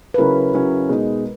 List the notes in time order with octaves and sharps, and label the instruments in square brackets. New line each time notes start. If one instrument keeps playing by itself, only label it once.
[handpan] B4
[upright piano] C#3 F#3 C#4 E4 [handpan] A#4
[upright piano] C#3 F#3 C#4 E4
B2 G#3 D#4